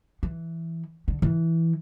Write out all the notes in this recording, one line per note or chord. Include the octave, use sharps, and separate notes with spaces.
E3
D3
E3